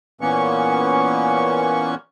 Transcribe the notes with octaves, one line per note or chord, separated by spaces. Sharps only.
A#2 E3 A#3 B3 C#4 C#6